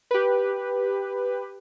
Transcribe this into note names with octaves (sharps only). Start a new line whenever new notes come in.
G4 B4